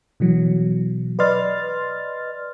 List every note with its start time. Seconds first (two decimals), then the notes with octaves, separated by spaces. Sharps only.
0.20 B2 E3 F#3
1.19 B4 D5 D#5 C6 F6 A6